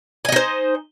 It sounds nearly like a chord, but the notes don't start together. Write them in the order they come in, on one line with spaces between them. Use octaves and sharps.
G#5 D#5 D#4 C5